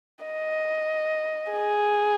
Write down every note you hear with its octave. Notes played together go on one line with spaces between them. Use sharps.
D#5
G#4